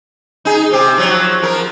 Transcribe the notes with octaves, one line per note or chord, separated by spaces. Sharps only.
D#4 G#4
C3 C4 G4
F3 F#3
F3 A#4